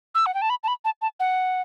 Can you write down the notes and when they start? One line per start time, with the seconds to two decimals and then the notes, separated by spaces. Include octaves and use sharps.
0.15 E6
0.26 F#5
0.34 G5
0.42 A5
0.50 B5
0.63 A5
0.68 B5
0.85 A5
1.02 A5
1.20 F#5